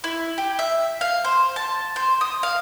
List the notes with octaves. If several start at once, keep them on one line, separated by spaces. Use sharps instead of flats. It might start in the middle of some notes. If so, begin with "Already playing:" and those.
E4
G4
E5
F5
C5
A5
C5
D#6
F5